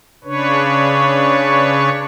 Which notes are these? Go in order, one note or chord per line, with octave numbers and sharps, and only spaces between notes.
C#3 D4 B4 C#5